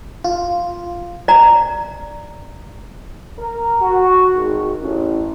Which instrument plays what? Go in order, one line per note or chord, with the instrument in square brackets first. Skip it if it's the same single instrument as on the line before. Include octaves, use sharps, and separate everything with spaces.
[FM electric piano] F4
[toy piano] D5 A#5
[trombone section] A#4
F#4
G#1
A1